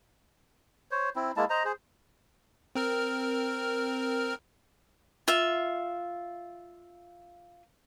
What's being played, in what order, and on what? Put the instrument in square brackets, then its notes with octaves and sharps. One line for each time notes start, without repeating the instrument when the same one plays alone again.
[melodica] C5 C#5
C4 E4
G#3 A#3 E4 A5
C5 D#5 A#5
G#4 C5
[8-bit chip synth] C4 A#4 F6
[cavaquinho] F4 E5